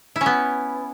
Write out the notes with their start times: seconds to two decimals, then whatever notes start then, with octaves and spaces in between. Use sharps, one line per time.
0.16 E4
0.21 C#4
0.26 B3